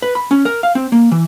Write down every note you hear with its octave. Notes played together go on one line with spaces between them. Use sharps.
B4
B5
C#4
A#4
F5
C4
A#3
E3